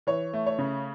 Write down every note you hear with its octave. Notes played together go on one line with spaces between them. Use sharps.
E3 C#5
A3
C#5
C#3